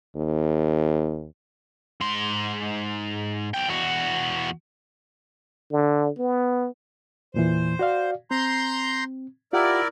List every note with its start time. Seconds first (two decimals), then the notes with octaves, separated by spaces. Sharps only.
0.16 D#2
2.01 G#2 C6
3.54 B1 G5
3.68 E2 F#4
5.72 D3
6.18 B3
7.34 E2 A#2 E3 C5
7.79 F#4 D5 F5
8.31 C4 A#5 C6 G6
9.53 E4 F4 G4 A#4 D5 F#5